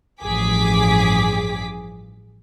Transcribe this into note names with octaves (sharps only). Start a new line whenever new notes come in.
A1 G2 F3 G#4 D6 B6